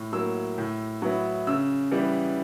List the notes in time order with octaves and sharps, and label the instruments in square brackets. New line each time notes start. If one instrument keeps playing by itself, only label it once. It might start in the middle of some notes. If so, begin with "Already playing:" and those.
Already playing: [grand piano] A2
F#3 A#3 E6
A2
F#3 B3 E4
C#3 E6
E3 G3 B3 E4